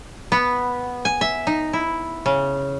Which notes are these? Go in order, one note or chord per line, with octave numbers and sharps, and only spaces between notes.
B3
G#5
E5
D#4
E4
C#3